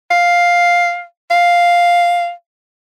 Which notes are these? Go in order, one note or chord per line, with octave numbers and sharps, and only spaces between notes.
F5
F5